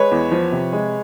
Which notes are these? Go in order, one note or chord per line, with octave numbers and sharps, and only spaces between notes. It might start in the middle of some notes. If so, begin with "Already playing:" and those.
Already playing: G#3 B4 C#5
E2
F3
C3
G#3